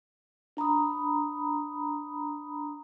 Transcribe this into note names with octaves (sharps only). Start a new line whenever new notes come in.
D4 A#5 B5 D#6